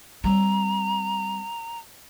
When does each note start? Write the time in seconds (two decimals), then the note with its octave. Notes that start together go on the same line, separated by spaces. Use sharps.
0.24 G3 C4 A#5